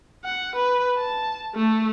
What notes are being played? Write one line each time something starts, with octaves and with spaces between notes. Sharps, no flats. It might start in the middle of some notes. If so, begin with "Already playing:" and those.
F#5
B4
A5
A3